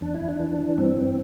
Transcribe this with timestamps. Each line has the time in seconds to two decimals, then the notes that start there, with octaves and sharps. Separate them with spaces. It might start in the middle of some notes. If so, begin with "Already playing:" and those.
0.01 E2 D4
0.14 E4
0.21 E2
0.29 D4
0.40 E3
0.59 E3
0.78 G2 C4
0.97 G2